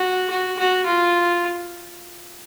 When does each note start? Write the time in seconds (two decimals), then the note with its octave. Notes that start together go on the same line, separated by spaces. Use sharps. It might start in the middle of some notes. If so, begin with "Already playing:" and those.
Already playing: F#4
0.30 F#4
0.59 F#4
0.86 F4